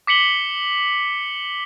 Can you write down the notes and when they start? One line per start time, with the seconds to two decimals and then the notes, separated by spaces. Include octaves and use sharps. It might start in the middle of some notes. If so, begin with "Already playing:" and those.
0.07 D6 B6 C#7 F#7 G7